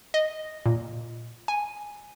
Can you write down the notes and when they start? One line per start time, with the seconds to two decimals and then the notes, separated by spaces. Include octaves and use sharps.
0.14 D#5
0.66 A#2
1.48 G#5